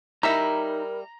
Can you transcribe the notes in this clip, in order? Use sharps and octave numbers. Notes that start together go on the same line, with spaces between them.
G3 D#4 E4 A#4 E5 A#5